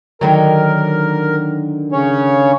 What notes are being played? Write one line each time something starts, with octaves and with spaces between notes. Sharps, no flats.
D3 D#3 F#3 A#4
C#3 C#4 C#5